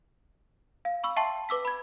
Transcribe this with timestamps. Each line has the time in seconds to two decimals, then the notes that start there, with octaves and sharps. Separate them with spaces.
0.85 F5
1.03 B5 C#6 E6
1.16 E5 G5 A5 C6 C#6 C7
1.49 B4 D6 E6 B6
1.65 B5 G#6